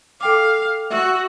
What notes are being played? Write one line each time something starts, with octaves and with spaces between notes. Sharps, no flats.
A4 F5 G5 D6
F#4 E5 E6